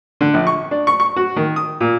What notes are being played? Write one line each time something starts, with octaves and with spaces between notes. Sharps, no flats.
D3
A#1
C#6
D4
C#6
C#6
F#4
D#3
D#6
A#2